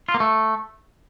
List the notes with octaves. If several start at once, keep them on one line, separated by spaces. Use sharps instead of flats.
F4
A#3
A3